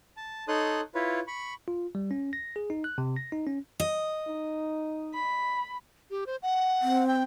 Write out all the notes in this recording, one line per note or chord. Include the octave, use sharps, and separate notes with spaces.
A5
D#4 A4 C#5 C6 D#6 F#6
E4 F4 B4 C#5
B5 C#6
F4
G3
C#4
A#6
G#4
D#4
F#6
C3
A#6
D#4
C#4
D#5
D#4
B5
G4
C5
F#5
C4
G5